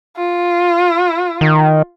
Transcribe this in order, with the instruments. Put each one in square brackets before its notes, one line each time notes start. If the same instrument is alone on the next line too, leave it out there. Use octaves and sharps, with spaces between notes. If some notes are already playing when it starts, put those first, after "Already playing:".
[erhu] F4
[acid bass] D#3